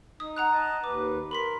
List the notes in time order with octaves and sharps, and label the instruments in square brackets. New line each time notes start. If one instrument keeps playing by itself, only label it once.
[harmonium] D#4 [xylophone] D#6
[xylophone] F#5 A#5 F#6
[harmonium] D#5 A5
[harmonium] D#2 B4 [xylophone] D6
[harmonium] A#4 [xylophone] B5 C6 B6